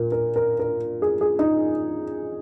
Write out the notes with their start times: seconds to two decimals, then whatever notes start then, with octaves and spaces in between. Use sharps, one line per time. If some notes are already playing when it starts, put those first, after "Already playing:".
Already playing: A#2 A#4
0.12 A#4
0.36 A#4
0.60 A#4
1.02 G#4
1.21 G#4
1.39 D#4